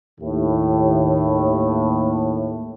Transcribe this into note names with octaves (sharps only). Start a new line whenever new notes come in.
D#2 A2